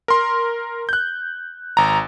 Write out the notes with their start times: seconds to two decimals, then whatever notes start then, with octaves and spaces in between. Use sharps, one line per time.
0.08 A#4 C6
0.89 F#6 G6
1.77 G#1 A#5